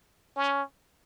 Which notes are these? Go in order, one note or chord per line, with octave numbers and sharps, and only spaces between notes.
C#4